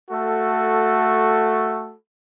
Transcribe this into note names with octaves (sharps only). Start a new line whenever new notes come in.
A3 F#4 A4